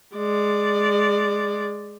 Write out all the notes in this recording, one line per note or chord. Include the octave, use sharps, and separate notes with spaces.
G#3 D5